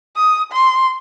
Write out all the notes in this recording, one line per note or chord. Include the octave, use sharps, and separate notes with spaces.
D#6
C6